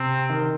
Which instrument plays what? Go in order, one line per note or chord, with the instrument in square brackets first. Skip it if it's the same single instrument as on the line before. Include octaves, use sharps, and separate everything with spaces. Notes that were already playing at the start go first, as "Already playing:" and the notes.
Already playing: [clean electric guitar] C3 [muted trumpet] C4
[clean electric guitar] D#3